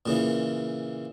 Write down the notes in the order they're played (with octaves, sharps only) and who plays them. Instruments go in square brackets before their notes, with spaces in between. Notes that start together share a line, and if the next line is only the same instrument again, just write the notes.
[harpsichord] A#2 C#3 E3